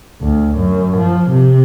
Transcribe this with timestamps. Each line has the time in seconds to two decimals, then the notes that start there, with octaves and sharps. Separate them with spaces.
0.22 D2
0.57 F#2
0.97 F3
1.31 C3